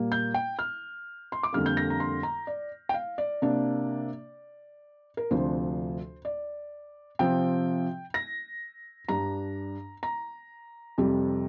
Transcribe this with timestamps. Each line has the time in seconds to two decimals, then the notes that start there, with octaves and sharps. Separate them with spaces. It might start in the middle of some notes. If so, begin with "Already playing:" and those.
Already playing: A#2 G3 A#3
0.12 G6
0.34 G5
0.59 F6
1.32 C6
1.43 D6
1.53 F2 D3 G3 A#3 F6
1.66 G6
1.77 A#6
1.90 A#5
2.00 C6
2.23 A#5
2.47 D5
2.89 G5
2.94 F5
3.18 D5
3.42 C3 A#3 D4
5.17 A#4
5.31 D2 C3 F3 D4 C5
6.25 D5
7.19 C3 F3 C4 G5
8.14 A#6
9.08 G2 G3 D4 A#5
10.03 A#5
10.98 F2 C3 G3